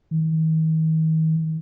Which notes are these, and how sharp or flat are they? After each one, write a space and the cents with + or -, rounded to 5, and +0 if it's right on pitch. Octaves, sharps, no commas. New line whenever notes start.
D#3 +40